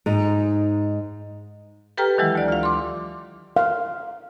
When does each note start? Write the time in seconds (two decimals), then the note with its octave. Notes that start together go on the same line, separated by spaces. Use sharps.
0.06 G#2 D#4
1.97 G4 A4 B4 G5 A#5 F6
2.18 D#3 E3 F#3 G#3 E4
2.35 D2 D5
2.48 F4 F5
2.63 C6 D6
3.56 F5